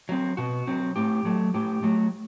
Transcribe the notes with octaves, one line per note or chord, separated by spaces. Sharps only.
F#3 C4
B2 F#4
F#3 C4
A2 G4
F#3 A3
A2 G4
F#3 A3